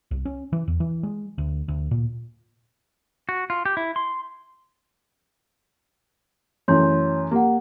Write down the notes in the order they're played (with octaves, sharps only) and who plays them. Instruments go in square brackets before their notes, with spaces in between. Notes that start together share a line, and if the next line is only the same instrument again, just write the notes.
[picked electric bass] C2
C#4
E3
E2
E3
G#3
D2
D2
A#2
[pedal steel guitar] F#4
F4
G4
E4
C6
[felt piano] F#2 E3 A3 [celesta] C#5 C6 G6
[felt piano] A#3 [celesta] G4 F#5